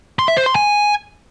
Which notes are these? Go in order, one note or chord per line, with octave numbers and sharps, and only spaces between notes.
C6
E5
C5
C6
G#5